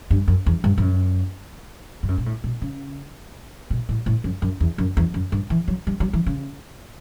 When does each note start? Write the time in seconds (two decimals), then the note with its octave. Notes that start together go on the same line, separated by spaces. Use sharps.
0.11 G2
0.28 F#2
0.46 E2
0.64 G2
0.78 G2
0.82 F#2
2.03 G2
2.08 F#2
2.18 B2
2.26 A2
2.44 B2
2.62 C#3
3.70 B2
3.89 A2
4.06 A2
4.24 F#2
4.42 F#2
4.60 E2
4.78 F#2
4.97 E2
5.14 F#2
5.32 G2
5.50 E3
5.68 F#3
5.87 G3
6.00 F#3
6.13 E3
6.26 C#3